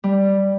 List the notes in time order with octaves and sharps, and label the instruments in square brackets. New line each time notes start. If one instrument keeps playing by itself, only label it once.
[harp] G3